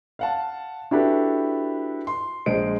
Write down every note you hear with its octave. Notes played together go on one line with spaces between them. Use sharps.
F5 F#5 A5
D4 E4 F#4 G4 A4 B4
C6
A#1 G#3 C5 D7